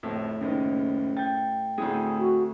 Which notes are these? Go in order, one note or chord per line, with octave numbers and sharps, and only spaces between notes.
D1 F2 A2
F#1 D#2 G#3 C#4
G5 G6 A6
D2 A2 C4 G#4
F#4